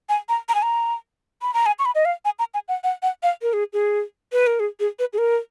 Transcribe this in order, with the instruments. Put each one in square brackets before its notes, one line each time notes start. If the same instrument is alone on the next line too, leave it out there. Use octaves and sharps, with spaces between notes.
[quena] G#5
A#5
A#5
G#5
A#5
B5
A#5
G#5
C#6
B5
D#5
F5
G#5
A#5
G#5
F#5
F#5
F#5
F5
A#4
G#4
G#4
B4
A#4
G#4
G#4
B4
G#4
A#4